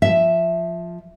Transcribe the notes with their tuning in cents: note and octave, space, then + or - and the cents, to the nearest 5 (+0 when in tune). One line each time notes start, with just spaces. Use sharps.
F3 +0 E5 +0